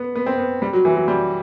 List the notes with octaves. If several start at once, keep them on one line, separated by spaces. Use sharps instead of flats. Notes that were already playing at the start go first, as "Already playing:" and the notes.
Already playing: B3
B3
C4
B3
G3
F#3
E3
F#3
G3